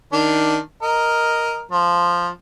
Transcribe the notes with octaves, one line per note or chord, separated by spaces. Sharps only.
D#3 D4
A#4 D#5
F3